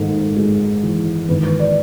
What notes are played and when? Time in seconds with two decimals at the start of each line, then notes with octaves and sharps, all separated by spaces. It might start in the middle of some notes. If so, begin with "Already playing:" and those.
Already playing: G#1 G#2 A4
0.36 G#3
0.83 E3
1.29 G#1 B4
1.59 D5